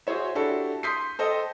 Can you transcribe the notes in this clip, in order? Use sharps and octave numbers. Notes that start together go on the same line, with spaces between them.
F#4 G#4 C5 C#5 E5
D4 E4 F#4 G4 A4
C6 D#6 G6 B6 C7
A4 C5 D#5 G5